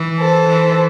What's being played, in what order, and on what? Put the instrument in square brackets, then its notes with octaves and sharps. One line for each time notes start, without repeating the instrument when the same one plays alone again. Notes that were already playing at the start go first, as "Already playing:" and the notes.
Already playing: [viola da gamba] E3
[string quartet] A4 C5
[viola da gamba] E3